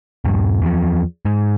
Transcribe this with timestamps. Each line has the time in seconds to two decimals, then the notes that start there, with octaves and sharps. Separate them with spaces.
0.25 D#1 G2
0.62 E2 F3
1.25 G#2